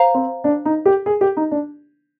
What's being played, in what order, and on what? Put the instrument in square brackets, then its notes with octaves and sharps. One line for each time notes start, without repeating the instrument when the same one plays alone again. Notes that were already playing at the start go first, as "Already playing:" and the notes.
Already playing: [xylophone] C5 F5 A#5
[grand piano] C4
D4
D#4
G4
G#4
G4
D#4
D4